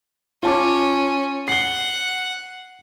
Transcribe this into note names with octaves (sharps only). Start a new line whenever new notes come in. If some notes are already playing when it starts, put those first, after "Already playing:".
C#4 F4 A5 D6
F#5 C7 G7